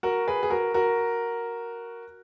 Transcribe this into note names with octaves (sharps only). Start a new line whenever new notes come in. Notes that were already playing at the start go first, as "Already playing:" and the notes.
F#4 A#4
G#4 B4
G#4
F#4 A#4
F#4 A#4